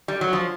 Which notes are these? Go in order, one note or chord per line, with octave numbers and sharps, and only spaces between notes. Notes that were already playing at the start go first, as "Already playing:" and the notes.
G3
F#3
F3